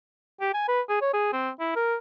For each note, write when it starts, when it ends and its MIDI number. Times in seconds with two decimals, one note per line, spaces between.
0.41 0.52 67
0.54 0.64 80
0.68 0.81 71
0.89 0.98 68
1.01 1.12 73
1.14 1.29 68
1.33 1.50 60
1.60 1.72 64
1.76 1.96 70